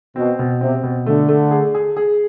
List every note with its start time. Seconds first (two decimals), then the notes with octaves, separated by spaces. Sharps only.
0.16 B2 C4
0.39 B2
0.61 C3 C4
0.83 B2
1.06 D3 A3
1.29 A3
1.51 G#4
1.75 G#4
1.97 G#4